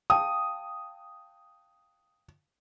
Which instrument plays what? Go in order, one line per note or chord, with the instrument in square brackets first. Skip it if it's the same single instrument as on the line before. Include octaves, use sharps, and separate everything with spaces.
[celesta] F5 G5 A5 [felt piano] D#6